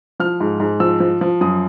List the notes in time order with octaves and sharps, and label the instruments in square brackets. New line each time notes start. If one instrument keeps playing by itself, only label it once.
[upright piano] F3 F6
G#2
G#2
F3 E6
F3
F3
F#2 D#6